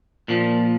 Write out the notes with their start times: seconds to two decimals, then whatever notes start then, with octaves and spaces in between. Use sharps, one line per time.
0.28 A#2 F3